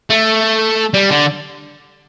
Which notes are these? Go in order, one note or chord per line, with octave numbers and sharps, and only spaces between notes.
A3
G3
D3